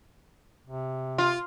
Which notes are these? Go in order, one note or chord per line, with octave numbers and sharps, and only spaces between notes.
C3
F4